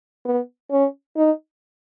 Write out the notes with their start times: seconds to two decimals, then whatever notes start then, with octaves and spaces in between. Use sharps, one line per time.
0.25 B3
0.71 C#4
1.16 D#4